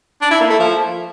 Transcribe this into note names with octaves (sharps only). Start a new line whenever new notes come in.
D4
E4
A#3
A3
F3